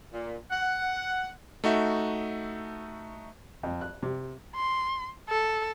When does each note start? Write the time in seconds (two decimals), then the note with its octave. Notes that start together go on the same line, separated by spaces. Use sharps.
0.13 A#2
0.51 F#5
1.64 A3 D#4 F#4 E5
3.63 F2
3.81 F#6
4.03 C3
4.55 C6
5.29 A4